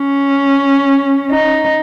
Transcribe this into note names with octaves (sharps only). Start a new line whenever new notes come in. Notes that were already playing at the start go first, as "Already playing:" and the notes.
Already playing: C#4
D#4